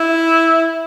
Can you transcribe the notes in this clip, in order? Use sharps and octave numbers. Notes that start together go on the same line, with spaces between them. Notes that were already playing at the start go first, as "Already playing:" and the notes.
Already playing: E4